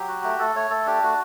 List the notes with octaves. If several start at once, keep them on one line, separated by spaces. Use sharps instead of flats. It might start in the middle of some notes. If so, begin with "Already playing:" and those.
Already playing: F#3 G4
F#4
A3
A3 A4
A3 C#5
A3 A4
D4 G4
A3 F#4